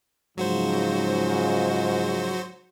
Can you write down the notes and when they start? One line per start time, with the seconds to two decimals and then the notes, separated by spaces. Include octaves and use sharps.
0.37 G#2 C#3 F3 F#3 F#4 C5